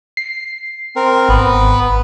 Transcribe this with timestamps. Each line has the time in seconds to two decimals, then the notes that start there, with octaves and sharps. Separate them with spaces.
0.17 C7
0.96 C4 A#4
1.29 G#1 B3 B4